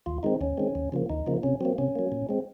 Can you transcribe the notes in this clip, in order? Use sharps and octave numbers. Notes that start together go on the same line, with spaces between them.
D#2 F4
D#3 G#3 C4 D#4
D#2 C#4
D#3 G#3 C4
D#2
C#3 F3 A#3
D#2 D#4
C#3 F3 A#3
C3 C#4
F#3 A#3 C4
C3 C#4
F#3 A#3
A#2
G#3 C4